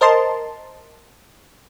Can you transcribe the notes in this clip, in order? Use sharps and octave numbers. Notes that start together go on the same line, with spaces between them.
A#4 C5 D#5 A5 C6